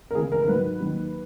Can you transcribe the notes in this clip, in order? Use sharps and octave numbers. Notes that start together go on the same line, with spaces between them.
A#4
C#2 C#3 E3 G#4
A#4
A#4
G#2 D#3 F#3 B4
D#2 D#3 F#3